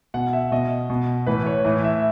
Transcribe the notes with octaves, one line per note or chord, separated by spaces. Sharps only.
B2 F#5
E5
B2 D#5
B2
A2 E3 B4
C#5
A2 E3
E5